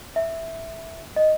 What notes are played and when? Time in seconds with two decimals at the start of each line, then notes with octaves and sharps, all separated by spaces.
0.16 E5
1.16 D#5